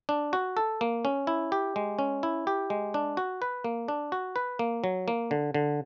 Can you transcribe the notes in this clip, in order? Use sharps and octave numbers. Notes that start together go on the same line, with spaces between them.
D4
F#4
A4
A#3
C#4
E4
G4
G#3
C#4
E4
G4
G#3
D4
F#4
B4
A#3
D4
F#4
B4
A#3
F#3
A#3
D3
D3